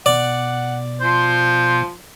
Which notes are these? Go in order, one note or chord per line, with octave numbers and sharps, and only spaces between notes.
B2 D5 F#5
F3 C5 C6